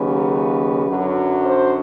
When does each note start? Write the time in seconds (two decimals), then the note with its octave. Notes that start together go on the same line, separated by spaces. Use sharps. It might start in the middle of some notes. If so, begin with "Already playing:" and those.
Already playing: D#2 C#3 F#3 B4
0.86 F#2 D3 F#3
1.43 C5